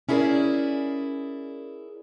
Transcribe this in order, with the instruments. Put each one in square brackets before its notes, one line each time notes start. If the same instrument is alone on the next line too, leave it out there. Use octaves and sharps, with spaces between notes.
[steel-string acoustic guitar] C#4 E4 G#4 A#4 D5